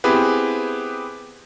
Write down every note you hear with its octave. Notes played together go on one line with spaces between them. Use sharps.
B3 C4 E4 G4 G#4 B4